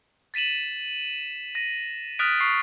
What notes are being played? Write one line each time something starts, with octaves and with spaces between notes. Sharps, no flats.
A6 B6 D#7 E7 F#7
A#6 D#7
D#6 F6 F#6 A6 B6 D7
C#6 C7